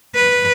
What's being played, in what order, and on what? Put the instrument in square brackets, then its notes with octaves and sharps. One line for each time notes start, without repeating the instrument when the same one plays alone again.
[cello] B4